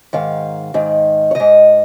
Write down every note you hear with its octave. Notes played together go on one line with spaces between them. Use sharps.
G#2 D#3 F5
G#2 D#3
C#5
G#2 D#3 D#5